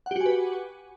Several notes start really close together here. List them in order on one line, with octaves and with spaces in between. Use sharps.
F#5 G4 F#4 G#5 B4